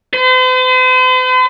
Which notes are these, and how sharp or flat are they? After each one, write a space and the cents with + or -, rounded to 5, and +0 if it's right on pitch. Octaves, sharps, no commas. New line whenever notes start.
C5 -45